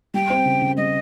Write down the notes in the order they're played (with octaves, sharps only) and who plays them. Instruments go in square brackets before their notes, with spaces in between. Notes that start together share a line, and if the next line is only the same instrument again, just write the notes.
[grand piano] G3 [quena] G5
[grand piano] C4
C#3
C#3
[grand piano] G3 [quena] D#5